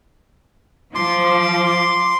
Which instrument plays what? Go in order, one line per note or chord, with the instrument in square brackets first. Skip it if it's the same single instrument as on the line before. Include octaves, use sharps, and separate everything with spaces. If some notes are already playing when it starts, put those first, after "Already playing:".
[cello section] F3 [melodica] C6 [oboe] D6